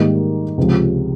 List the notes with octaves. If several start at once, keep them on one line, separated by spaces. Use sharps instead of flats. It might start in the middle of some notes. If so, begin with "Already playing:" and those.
Already playing: G#2 D#3 G3 A#3 D#4
C#2 C3 F3